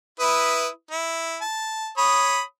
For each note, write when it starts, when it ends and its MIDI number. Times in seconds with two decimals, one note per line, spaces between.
0.20 0.68 64
0.20 0.68 71
0.20 0.68 87
0.91 1.38 64
1.41 1.89 81
1.97 2.41 73
1.97 2.41 83
1.97 2.41 87